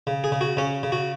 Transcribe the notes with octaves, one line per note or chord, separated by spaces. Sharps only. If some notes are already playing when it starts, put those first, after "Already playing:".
C#3
G#4
C#3
F#4
C#3 C#4
C#3
F#4